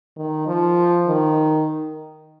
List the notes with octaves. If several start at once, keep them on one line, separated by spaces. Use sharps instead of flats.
D#3
F3
D#3